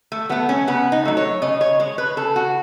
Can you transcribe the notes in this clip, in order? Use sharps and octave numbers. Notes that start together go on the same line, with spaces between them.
A3
F#3 A3 B3
C#4
C#3 B3
D#4
F#3 A3
C#5
C#3 D#5
C#5
G#3 C#5
B4
C#3 A4
F#4